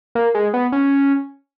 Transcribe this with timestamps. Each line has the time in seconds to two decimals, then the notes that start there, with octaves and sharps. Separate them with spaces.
0.15 A#3
0.35 G#3
0.54 B3
0.72 C#4